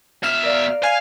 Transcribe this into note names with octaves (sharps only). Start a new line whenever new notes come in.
B2 E5 F6
A#4 D5 F5
F5 G#5